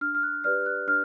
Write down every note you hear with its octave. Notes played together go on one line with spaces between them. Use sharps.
D4 F6
F6
F#6
G4 B4 D5 F6
F#6
D4 F6